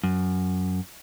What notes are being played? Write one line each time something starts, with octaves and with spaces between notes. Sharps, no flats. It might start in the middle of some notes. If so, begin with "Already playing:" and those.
F#2